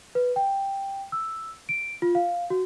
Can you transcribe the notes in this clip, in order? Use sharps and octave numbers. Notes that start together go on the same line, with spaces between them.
B4
G5
E6
D7
F4
F5
F#4